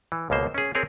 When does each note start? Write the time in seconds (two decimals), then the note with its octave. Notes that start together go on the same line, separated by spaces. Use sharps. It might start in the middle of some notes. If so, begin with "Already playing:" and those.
0.12 E3
0.30 C#2 B2 A#3 C5
0.54 C#4 G#4
0.75 C4 G#4 A#4 C#5